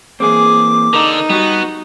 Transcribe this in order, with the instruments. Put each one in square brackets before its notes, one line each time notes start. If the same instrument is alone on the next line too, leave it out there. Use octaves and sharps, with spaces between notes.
[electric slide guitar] E3 A#3 C4 [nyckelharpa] G#4 [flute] D6
[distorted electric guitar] D3 [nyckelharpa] D#4 [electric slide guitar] A#4
[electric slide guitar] G3 G4 [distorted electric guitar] B3 [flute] F#4